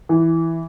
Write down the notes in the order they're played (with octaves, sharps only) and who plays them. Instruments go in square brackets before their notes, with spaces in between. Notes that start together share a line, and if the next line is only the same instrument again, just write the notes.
[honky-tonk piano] E3